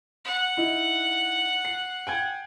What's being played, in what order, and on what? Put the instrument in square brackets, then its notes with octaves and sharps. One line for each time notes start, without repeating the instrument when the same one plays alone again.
[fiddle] F#5
[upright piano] D#4 E4
C7
G5 G#5 G#6